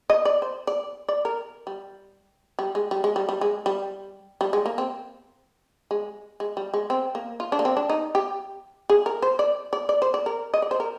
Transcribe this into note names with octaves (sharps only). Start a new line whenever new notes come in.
D#5
D5
C5
D5
D5
A#4
G3
G3
G#3
G3
G#3
G3
G3
G#3
G3
G3
G#3
A#3
C4
G#3
G#3
G3
G#3
C4
A#3
F4
D4
A#3
C4
D4
D#4
G4
G#4
A#4
C5
D5
D5
D5
C5
D5
A#4
D#5
D5
C5
A#4